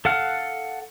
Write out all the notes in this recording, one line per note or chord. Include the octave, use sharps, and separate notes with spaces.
A4 F5 F#5 F6